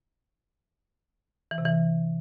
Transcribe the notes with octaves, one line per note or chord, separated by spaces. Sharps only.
E3
C3
E3